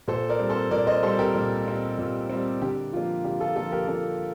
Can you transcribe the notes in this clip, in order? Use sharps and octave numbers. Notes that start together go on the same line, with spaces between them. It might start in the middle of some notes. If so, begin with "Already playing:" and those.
A#2 A4 C5
A#4 D5
G3 C4
A4 C5
A#2 A#4 D5
C5 D#5
G3 C4 A4 C5
G4 A#4
A#2
G3 C4
A#2
G3 C4
D3 G4
F3 A#3 F4
D3 G4
F4 A4
F3 A#3 F4 A4
G4 A#4
D3 F4 A4